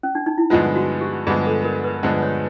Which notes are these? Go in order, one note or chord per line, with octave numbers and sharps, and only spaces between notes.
C#4
D4
D#4
E4
G2 D3 F3 G#3 B3 F4
F#4
G4
G2 D3 F3 G#3 B3 G#4
A4
A#4
B4
G2 D3 F3 G#3 B3 C5
C#5